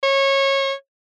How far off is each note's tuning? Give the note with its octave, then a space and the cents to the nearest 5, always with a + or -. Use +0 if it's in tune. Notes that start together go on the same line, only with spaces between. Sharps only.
C#5 -20